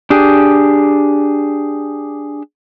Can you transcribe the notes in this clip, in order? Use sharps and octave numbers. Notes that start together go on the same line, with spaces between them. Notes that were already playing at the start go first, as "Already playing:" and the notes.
D4 G4 G#4